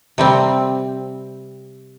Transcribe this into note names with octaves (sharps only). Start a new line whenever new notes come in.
C3 G3 C4